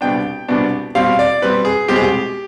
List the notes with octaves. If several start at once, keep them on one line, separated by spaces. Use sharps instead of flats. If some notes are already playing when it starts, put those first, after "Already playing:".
C2 B2 B3 D4 G5
C2 B2 B3 D4
B2 G3 C4 F5
D5
B2 G3 C4 B4
G#4
C2 B2 G#3 C4 G4
G#4
G4